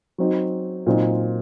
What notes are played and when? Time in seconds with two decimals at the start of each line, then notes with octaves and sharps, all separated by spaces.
0.18 F#3 C4 D#4
0.87 A#2 F#3 C4 D#4